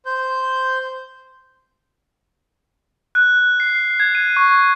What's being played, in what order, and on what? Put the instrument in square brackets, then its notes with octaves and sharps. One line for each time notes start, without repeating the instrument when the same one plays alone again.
[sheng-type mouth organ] C5 G6
[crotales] F#6
C7
G#6
D#7
C#6